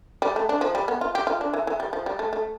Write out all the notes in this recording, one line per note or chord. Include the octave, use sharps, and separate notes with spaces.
G3
A3
D4
F3
G3
B3
F4
G4
F4
D4
E3
E3
G3
F3
G3
A3
A3